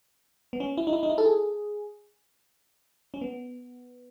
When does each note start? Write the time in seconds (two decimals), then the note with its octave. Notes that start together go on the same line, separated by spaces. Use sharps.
0.53 B3
0.60 C#4
0.77 E4
0.87 D#4
0.93 E4
1.03 D#4
1.09 E4
1.18 A4
1.26 G#4
3.14 C#4
3.21 B3